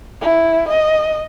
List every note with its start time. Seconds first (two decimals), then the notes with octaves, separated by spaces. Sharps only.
0.21 E4
0.69 D#5